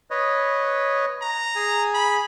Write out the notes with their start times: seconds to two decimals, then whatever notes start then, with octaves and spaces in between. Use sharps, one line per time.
0.11 B4 C#5 D#5
1.22 A#5
1.56 G#4 G#5
1.94 B5